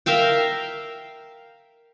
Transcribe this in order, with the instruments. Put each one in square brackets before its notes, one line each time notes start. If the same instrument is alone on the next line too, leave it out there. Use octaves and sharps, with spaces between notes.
[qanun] A#4 E5 F5 G5